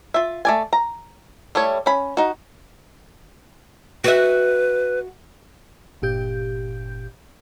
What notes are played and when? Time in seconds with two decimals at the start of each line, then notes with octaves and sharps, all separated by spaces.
0.14 F4 E5
0.45 A3 D5 G#5
0.73 A#5
1.55 G3 A3 E4 C#5
1.86 C#4 B5
2.17 D#4 F#4
4.04 F#4 B4 E5
6.02 G1 A#2 G4 G6